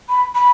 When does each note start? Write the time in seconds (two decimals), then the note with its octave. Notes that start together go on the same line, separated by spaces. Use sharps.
0.09 B5
0.35 B5